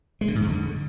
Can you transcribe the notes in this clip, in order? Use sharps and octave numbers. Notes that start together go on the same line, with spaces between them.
G#3
D3
G#2
F2
D3